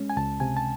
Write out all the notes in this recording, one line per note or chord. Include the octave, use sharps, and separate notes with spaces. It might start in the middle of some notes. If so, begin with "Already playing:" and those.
Already playing: G#3 C#4
G#5
C#2 A5
C3 G#5
A5